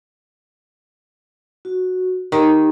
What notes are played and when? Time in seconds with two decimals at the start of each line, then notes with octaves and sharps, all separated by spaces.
1.65 F#4
2.32 D#3 D#4 G4